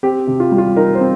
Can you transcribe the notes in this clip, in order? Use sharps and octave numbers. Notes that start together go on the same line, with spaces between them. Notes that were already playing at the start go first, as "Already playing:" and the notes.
C4 G4
C3
F4
G3
F4
D#4 A#4
C5
C4